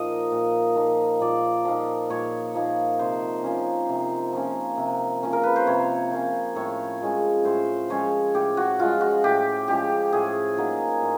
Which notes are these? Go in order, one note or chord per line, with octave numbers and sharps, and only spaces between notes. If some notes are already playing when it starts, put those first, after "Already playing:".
Already playing: A#2 F3 A#3 D#4 D#5
A#2
F3 A#3 D#4
A#2 D5
F3 A#3 D#4
A#2 C#5
F3 A#3 D#4
C3 C5
F3 A#3 C#4
C3
F3 A#3 C#4
C3
F3 A#3 C#4
A#4
B4
C5
C3 C#5
F3 A#3 C#4
A2 C#5
F3 G#3 C#4
A2 C5
F3 G#3 C#4 C#5
A2 G4
F#4
F3 G#3 C#4 F4
F#4
A2 G4
F3 G#3 C#4 G4
A2 G#4
F#3 A#3 D#4
A2